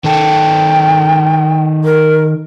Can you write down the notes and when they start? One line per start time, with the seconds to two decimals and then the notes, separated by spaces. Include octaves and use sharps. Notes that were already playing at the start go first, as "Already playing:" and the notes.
0.04 D#3 A4 G5
1.84 A#4